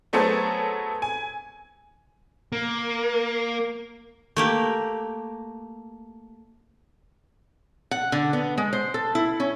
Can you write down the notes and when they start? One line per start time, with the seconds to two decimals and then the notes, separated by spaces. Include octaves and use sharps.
0.13 F#3 A3 B3 G#4 A4 C5
1.02 G#5
2.52 A#3
4.36 A3 A#3 G4
7.91 F#5
8.12 D3
8.33 B3
8.58 G#3
8.73 C5
8.94 A4
9.15 E4
9.40 C#4